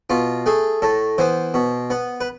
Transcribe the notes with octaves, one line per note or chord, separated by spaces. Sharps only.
B2 F4
A3 G#4
A2 A4
E3 B3 C5
B2
B3
B4